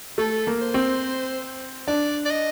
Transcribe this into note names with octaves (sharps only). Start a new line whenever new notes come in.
A3 A4
A#3
C5
C4
D4 D5
D5
D#5